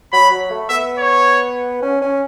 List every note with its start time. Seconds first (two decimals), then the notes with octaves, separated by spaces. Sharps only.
0.13 F#3 B5
0.31 F#3
0.50 A3
0.69 B3 E5
0.98 C#5
1.82 C#4
2.01 C#4